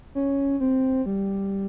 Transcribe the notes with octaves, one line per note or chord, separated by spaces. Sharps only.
C#4
C4
G3